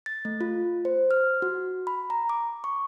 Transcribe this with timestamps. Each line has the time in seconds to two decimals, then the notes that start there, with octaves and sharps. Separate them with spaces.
0.06 A6
0.25 A3
0.41 F4
0.85 C5
1.11 F6
1.42 F#4
1.87 B5
2.10 A#5
2.29 D6
2.64 C#6